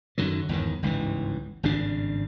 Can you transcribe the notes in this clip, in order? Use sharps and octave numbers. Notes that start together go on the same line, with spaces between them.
F#2 D3 D#3 F#3
G1 E2 G#2 D#3
G1 C#2 G#2 E3
G#1 G2 C#3 D4